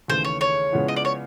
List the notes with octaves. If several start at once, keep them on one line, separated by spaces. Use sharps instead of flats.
D#2 C#3 E3 A3 C5
C#5
C#5
C#3 F3 G#3 B3 E4
D#5
D5
C#5